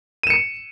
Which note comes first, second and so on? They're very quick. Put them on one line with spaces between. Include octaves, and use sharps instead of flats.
D#7 E7 C#7